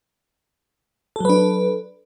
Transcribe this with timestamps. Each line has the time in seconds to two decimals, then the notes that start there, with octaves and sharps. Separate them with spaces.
1.16 A4
1.20 F#3
1.25 B4
1.29 D4